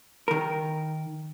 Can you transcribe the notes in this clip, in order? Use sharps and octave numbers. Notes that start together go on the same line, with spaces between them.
D#3 A#4